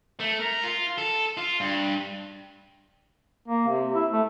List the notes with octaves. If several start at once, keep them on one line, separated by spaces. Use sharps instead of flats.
A3
A#4
F4
A4
F4
G2
A#3
C3
E4
A3